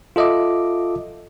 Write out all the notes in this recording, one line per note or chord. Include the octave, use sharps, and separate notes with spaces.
F4 A4 D#5 E5 D6